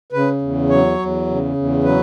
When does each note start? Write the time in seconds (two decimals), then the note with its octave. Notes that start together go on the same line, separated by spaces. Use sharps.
0.12 C#3 B4
0.41 E2
0.70 F#3 C#5
0.99 E2
1.28 C#3
1.56 E2
1.84 F#3 B4